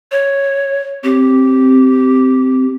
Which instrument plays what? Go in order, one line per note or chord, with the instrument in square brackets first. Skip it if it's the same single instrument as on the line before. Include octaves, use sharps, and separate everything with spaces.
[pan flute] C#5
[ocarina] C4 [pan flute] G4